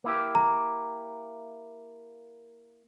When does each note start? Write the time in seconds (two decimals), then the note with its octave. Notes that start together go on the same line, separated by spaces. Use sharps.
0.04 A#3 E4 G4
0.35 A#5